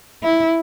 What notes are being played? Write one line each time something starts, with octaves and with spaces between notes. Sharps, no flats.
E4